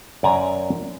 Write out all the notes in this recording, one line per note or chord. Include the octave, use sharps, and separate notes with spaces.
F#2 D5 G#5 A#5